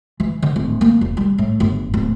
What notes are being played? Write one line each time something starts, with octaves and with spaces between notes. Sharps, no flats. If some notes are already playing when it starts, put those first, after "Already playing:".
E3
D3
D1
A#3
E1
G3
A2
G1
D1